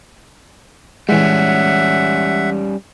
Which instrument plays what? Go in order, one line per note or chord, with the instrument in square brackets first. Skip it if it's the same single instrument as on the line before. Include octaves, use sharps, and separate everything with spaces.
[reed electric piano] E3 G#3 [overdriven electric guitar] G3 C#4 [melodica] E5 F#5